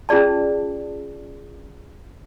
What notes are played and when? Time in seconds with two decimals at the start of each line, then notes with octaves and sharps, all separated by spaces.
0.09 C#4 F4 G#4 D5 A5